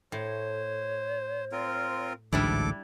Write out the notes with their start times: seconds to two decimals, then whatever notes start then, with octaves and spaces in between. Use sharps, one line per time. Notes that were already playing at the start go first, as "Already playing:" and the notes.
0.12 A2 C5 C#5
1.52 C4 F4 A#4
2.33 A1 D2 G#2 G3 D4 E4 A4 D6